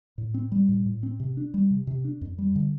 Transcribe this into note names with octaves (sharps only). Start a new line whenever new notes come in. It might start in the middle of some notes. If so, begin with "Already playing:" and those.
A2
C4
G3
A2
A2
C4
C3
D4
G3
C3
C3
D4
F2
G3
D3